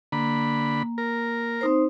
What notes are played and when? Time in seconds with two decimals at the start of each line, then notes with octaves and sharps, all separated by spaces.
0.12 D3 A#3 B5
0.98 A#4
1.61 C4 D#4 C5